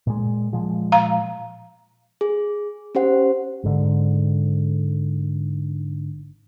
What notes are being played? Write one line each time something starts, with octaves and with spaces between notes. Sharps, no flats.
A#2 G#3
A#2 F3 G#3
F5 A#5
G#4
C#4 G4 C5 F#5
G#1 G#2 D3